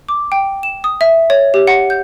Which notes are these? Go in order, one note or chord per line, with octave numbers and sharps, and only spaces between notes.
D6
G5
E7
D#6
E5
C#5
G4
F#5
G6